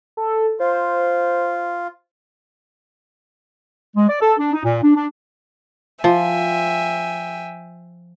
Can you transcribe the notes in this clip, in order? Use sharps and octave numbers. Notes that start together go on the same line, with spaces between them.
A4
F4 C5
G#3
D5
A4
D4
D#4
A#2
D4
D4
F3 E5 G5 G#5